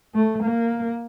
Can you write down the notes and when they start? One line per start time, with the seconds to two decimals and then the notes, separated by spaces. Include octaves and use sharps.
0.14 A3
0.43 A#3